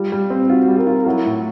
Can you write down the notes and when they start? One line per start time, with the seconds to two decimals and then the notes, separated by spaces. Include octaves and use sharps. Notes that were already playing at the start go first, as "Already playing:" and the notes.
Already playing: G3 F4
0.12 G3
0.30 C4
0.49 F4 F#4
0.68 G3
0.78 A#4
0.87 F4
1.06 F#3 E4
1.26 A2